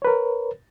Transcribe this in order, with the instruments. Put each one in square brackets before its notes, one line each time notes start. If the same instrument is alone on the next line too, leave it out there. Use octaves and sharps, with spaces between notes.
[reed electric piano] C#5
B4
A#4